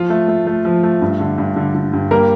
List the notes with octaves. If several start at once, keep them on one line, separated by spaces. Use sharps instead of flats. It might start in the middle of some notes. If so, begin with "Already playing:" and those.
Already playing: F3 F4
A3
A3
A3
F3
A3
G2
D3
G2
D3
D3
G2
G3 A#3 A#4